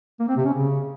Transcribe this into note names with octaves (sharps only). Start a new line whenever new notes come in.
A#3
C4
C3
C#4
C#3